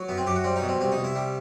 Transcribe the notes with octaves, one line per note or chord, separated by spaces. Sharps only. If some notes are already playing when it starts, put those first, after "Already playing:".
Already playing: F#3
F#2 B3
C4
F#2 G4
F#4
G3 C4
D#4
B2
C4
C2 C4
D#4
C2
E4
G3